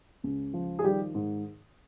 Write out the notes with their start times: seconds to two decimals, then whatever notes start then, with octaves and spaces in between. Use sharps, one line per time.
0.24 C#2
0.53 F3
0.79 G#4
0.84 D#3 G3 G4
1.15 G#2